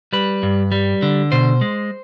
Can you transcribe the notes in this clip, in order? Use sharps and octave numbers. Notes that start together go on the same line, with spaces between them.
G3 B4
G2
G3
D3
B2 C5
G#3